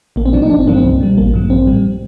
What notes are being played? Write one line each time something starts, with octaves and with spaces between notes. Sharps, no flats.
A#1 A#3
C4
A#2 F3 D4
D#4
G1 D4
C4
G2 F3 A#3
C4
C2
A#2 G3
A1 A#3
G2 F3
A#1 C4
A2 G3